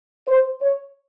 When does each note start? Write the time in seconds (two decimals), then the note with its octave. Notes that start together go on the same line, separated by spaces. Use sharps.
0.28 C5
0.61 C#5